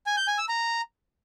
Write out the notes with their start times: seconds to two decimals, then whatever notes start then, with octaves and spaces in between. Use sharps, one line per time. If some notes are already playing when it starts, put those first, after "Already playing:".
0.06 G#5
0.17 G6
0.28 G#5
0.38 E6
0.49 A#5